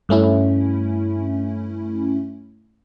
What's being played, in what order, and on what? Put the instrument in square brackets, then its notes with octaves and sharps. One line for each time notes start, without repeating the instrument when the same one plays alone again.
[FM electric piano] G2 A3 C#4 E4